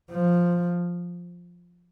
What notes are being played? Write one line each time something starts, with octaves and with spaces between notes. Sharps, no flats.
F3